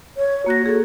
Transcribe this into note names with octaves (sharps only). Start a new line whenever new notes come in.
C#5
A#3 F#4 F#6 A#6
F#4 G#4 A4